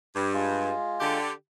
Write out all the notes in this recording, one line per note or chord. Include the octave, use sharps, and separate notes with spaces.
G2 D5
G#3 F4
D3 G4